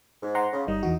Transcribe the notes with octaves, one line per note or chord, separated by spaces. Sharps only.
G#2
F#5 A#5 C6
C#3
G1 G3 D#4
E2 E3 F#4